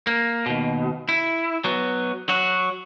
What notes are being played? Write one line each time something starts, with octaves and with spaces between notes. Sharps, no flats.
A#3
D#2 B2
E4
F#3 B3
F#3 F#4